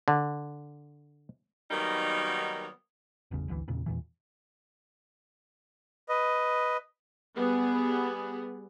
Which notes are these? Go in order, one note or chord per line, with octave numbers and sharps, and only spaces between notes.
D3
D#3 F#3 G3 A#3 B3 D#4
G#1 E2 C#3
G#1 D2 C3 E3
E2 A#2 C#3
E2 A#2 E3
B4 D#5
G3 B3 G#4